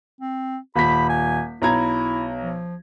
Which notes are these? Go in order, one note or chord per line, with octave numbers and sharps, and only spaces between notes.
C4
D#1 B5 B6
G#5
B1 E4 A#5 G#6
F3